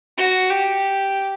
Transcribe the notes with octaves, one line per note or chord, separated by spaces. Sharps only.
F#4
G4